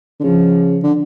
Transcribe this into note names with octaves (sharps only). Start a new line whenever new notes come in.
D3
C#3 F3
D3